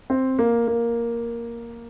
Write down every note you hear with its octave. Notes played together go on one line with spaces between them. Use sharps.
C4
A#3
A#3